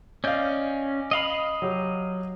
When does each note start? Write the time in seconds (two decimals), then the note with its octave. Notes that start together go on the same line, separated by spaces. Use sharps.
0.24 C#4 D5 D#5 F5 G6
1.11 D#5 F5 B5
1.62 F#3 G4